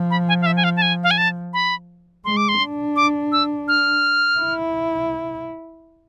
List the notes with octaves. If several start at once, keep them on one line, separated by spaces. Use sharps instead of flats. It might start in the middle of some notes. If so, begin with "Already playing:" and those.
Already playing: F3
B5
G#5
F5
E5
G#5
F5
A5
G#5
F5
G#5
A5
B5
G#3 C6
D6
C6
D4
D6
E6
F6
E4